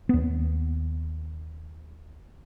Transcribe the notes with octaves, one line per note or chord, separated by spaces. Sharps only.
D#2 B3